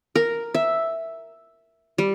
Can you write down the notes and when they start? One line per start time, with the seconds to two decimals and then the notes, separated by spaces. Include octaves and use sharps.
0.16 A#4
0.55 E5
1.98 G3